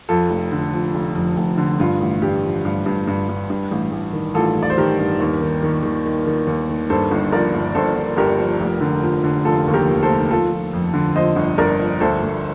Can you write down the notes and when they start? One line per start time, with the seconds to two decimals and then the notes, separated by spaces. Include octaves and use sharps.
0.09 F2 F4 A4
0.30 F1
0.52 D3
0.73 F3
0.94 F1
1.15 F2
1.37 F1
1.58 D3
1.80 G2 F4
2.01 A1
2.22 G2 G4
2.43 F3
2.65 G2
2.86 G2
3.07 G2
3.29 G2
3.50 G2
3.71 A1
3.92 A1
4.13 D#3
4.34 A1 F4 A4
4.57 A1
4.63 D5
4.70 C5
4.78 D#3 G4 A#4
4.98 G2
5.20 D#2
5.41 D#3
5.63 D#3
5.83 D#3
6.06 D#3
6.26 D#3
6.47 D#2
6.69 D#3
6.90 G2 A4 C5
7.11 G1
7.32 F3 A#4 D5
7.54 G1
7.75 G1 A4 C5
7.96 G1
8.17 G1 G4 A#4
8.38 F3
8.60 F1
8.81 D3
9.02 F3
9.24 D3
9.45 F1 F4 A4
9.67 D#2
9.74 G4 A#4
9.88 D#2
10.03 A4 C5
10.09 F1
10.30 F3 F4 A4
10.52 F3
10.73 F2
10.94 D3
11.15 F3 C5 D#5
11.36 G1
11.58 G1 A#4 D5
11.79 F3
12.00 D2 A4 C5
12.22 D2